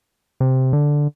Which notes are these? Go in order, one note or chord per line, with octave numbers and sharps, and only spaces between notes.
C3
D3